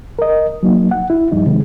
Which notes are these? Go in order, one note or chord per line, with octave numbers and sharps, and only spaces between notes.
A#4 D#5
F#3 A#3 D#4
F#5
E4
G2 F3 G3 D#4
C3 D#3 G#3